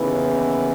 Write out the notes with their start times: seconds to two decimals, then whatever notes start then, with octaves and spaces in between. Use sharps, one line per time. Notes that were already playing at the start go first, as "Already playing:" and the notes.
Already playing: D#2 C#3 E3 B3